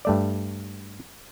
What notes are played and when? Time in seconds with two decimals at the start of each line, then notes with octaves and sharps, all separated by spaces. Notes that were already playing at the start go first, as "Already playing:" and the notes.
0.05 G2 A3 D5